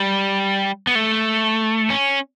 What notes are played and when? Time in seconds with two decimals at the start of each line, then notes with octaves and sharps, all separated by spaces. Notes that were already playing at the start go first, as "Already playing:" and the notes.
Already playing: G3
0.87 B3
0.95 A3
1.90 C#4